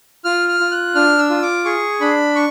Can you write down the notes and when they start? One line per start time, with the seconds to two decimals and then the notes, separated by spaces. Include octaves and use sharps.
0.25 F4 F6
0.48 F6
0.60 F4
0.71 F#6
0.95 D4 F6
1.18 E6
1.30 F4
1.42 D6
1.65 G#4 C#6
2.01 D4 B5
2.35 C#6